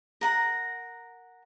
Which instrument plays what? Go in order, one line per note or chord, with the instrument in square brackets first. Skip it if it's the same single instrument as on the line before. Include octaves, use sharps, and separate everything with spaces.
[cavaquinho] A#4 F#5 A#5